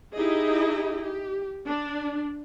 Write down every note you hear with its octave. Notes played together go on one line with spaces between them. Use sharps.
D#4 E4 G4 G#4 D#5
G4
D4